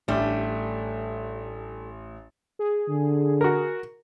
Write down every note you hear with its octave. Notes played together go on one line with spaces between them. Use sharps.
A1 G3 A3 D4
G#4
D3
F#4 A#4